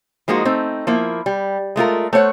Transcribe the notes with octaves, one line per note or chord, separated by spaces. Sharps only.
F3 G#3 A#3 D#4 F#4
A3 C4 D#4
F3 A#3 E4
G3
G#3 A3 F4 A#4
A3 C5 C#5 F#5